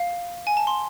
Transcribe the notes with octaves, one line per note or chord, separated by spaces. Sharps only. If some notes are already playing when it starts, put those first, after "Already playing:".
Already playing: F5
G#5
A5
C6